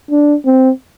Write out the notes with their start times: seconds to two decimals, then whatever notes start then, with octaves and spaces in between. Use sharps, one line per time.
0.11 D4
0.46 C4